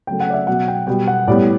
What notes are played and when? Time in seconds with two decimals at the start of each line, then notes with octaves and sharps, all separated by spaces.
0.07 C#3 F#3 A3 G5
0.20 F#5
0.30 D5
0.34 E5
0.47 B2 F#3 B3 F#5
0.68 G5
0.87 B2 G3 B3 G5
1.07 F#5
1.27 A2 G3 B3 D5